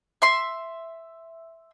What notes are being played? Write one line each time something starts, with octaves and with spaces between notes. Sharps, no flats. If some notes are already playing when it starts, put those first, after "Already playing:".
E5 C6